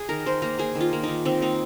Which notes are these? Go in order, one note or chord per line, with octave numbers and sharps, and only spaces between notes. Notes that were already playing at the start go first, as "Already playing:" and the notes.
Already playing: G#4
D#3 A#4
D#3 C5
A#3 A#4
A#3 G#4
D#3
F4
A#3
D#3 D#4
D#3 C4
A#3 D#4